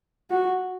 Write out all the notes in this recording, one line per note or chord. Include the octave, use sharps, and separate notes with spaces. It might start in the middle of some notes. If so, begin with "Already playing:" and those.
F#4